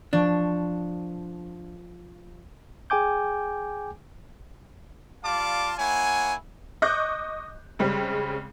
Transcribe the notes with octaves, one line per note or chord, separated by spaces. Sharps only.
F3 D4 C#6
G#4 G5 G#5 D6 G6
G3 F4 D5 F5 A5 D6
A#3 E4 C#5 F#5 G#5
D#5 C#6 D6 F#6 G6
C#3 G3 G#3 C4